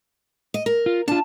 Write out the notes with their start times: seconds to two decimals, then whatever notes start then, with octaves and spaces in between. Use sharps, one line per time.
0.54 D#5
0.66 A#4
0.86 F4
1.08 D4 F4 A5